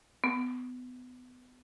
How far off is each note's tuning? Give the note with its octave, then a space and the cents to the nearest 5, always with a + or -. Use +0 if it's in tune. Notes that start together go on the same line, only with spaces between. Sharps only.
B3 +25